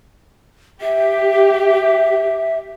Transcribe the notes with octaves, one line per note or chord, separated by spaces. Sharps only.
G4 E5